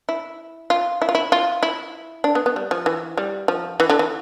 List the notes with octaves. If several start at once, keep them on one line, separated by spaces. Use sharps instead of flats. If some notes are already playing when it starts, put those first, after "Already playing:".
E4
F4
E4
F4
E4
F4
E4
D4
B3
B3
G3
F3
E3
G3
F3
E3
D3
E3